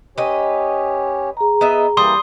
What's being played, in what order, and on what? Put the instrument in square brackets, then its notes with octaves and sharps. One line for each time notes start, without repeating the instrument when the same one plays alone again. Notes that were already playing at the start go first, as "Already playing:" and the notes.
[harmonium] C#4 G4 C#5 [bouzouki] B4 D#5
[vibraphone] G#4 A#5
[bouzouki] B3 D#5 E5
[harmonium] E3 A#3 [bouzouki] G3 [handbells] C6 D#6